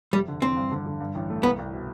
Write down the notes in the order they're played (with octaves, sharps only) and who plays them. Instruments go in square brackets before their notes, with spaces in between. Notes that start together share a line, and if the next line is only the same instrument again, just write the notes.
[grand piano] F1 [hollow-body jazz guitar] G3
[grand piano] D3
[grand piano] E2 [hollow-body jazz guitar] C4
[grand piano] G2
D3
D3
G2
A1
A3
[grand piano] C2 [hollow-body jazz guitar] B3
[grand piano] C2
B2